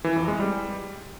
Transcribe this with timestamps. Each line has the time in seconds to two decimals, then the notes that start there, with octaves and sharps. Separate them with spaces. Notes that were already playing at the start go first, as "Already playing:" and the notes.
0.04 E3
0.16 F2
0.28 G#3
0.40 G3